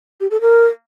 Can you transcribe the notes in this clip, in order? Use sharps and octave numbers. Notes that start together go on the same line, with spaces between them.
G4
A4
A#4